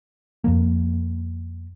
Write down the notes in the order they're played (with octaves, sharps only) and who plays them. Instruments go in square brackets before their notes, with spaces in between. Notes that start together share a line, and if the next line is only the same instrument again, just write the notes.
[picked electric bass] F2 F3 A#3